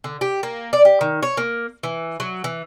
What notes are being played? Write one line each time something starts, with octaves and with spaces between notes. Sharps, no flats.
D3
G4
A#3
D5
G4
D#3
C#5
A#3
E3
F#3
E3